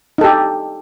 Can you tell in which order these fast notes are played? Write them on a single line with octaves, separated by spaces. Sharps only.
D#4 A4 G4